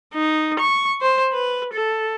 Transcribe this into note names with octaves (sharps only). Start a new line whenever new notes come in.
D#4
C#6
C5
B4
A4